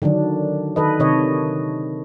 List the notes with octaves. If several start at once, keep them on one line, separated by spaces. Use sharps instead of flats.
D3 D#3 F#3 D4
D#3 A4 B4 D#5
C3 D#3 C#5 D#5